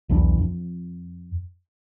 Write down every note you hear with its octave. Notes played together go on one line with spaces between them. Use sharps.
B1 E2 E3 D4
F2